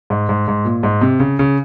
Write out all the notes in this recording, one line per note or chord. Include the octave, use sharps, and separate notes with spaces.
G#2
G#2
G#2
A#2
G#2
C3
C#3
C#3